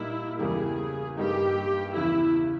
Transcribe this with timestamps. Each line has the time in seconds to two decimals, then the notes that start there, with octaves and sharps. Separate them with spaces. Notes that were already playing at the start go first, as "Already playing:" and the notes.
Already playing: A#2 G3 A#3 D#4 E4
0.38 E2 C#3 G3 A#3 E4 G#4
1.17 G2 G3 A#3 D#4 G4
1.95 E2 C#3 E3 E4